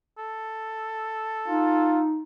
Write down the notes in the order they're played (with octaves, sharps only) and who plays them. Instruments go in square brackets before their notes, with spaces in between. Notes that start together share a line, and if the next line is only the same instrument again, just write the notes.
[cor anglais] A4
[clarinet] D#4 [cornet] F4